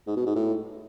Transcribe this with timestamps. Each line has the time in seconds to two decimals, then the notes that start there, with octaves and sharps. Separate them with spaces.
0.07 G#2
0.17 B2
0.26 G#2
0.36 A2